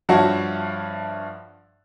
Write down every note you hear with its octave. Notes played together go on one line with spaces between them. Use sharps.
G2 F3 F#4 C#5 E5 A5